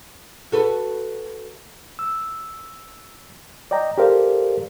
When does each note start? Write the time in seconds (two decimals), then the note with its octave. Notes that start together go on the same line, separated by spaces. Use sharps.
0.52 F#4 A4 B4
1.99 E6
3.71 D5 D#5 G5 A#5
3.98 G4 A4 A#4 C5 D5 F5